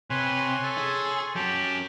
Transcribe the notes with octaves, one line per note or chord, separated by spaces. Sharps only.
C3 B4 C#5 G#5 C6
A4
G#4
F#3 C#4 G4 A5